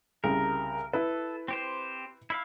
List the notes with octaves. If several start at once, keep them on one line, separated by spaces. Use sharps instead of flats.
C2 C#3 A#4
E4 A4 B4
C4 G4 C5
E4 E5 F5